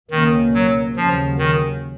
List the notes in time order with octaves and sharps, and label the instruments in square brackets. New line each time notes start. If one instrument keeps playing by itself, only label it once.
[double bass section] C#2 B2 A#3 C#4 [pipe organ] D#3
[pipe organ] F#3
[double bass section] D#2 C#3 F#3 C#4 [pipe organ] F3
[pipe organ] D#3